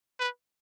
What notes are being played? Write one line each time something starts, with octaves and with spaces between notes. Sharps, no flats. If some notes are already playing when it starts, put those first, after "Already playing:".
B4